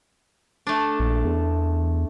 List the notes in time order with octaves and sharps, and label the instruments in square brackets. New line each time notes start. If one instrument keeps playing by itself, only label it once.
[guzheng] A3 D4
[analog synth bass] A#1
E2